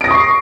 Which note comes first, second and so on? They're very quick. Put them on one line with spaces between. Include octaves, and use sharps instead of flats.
D7 A#6 D#6 C#6 C7